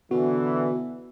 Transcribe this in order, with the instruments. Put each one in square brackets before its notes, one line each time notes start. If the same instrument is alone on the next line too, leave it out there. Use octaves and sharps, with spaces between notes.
[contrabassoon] B2 [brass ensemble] D3 E3 [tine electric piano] F#4